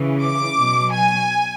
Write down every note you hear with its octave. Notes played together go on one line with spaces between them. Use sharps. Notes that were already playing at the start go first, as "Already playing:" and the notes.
Already playing: C#3 E3
D6
B2 F#3
G#5